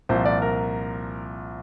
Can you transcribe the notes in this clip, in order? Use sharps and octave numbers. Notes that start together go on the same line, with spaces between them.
C2 A#2 F3 C5
D5
A#4